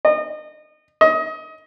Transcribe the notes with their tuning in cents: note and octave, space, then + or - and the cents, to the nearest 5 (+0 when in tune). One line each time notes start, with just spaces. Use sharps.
D#5 -30
D#5 +25